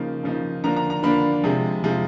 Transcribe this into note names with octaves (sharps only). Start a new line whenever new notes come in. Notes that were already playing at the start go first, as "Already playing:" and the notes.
Already playing: C#3 F3 A#3 D#4
C#3 F3 A#3 D#4
D3 F3 A#3 D4 A#5
A#5
A#5
D3 F3 A#3 D4 B5
C3 F3 G#3
C3 F3 G#3